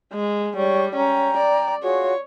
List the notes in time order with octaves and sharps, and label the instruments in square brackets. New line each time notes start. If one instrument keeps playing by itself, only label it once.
[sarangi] G#3
[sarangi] G3 [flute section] D4 C#5 C#6
[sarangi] C#4 [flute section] G5 A#5
[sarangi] D5
[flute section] F4 F#4 G#4 [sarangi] C#5